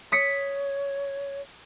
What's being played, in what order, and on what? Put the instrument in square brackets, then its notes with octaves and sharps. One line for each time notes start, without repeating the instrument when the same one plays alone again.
[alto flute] C#5 [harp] D#6 B6 C#7